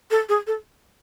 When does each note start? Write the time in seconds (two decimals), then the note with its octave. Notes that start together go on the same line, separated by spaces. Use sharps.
0.11 A4
0.29 G#4
0.47 A4